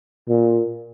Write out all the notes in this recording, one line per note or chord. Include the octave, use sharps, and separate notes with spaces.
A#2